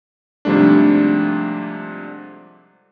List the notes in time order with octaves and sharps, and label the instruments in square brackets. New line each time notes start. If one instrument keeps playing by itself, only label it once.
[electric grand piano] G#2 C3 F3 G3 A3 D4